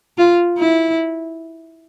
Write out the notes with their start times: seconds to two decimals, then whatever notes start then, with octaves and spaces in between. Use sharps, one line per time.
0.18 F4
0.58 E4